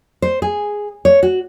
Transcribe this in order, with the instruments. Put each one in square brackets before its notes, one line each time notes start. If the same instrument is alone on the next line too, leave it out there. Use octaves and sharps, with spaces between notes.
[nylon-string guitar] C5
G#4
C#5
F#4